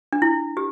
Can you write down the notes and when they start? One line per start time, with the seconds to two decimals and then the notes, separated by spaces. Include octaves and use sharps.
0.13 D4
0.22 E4
0.57 G4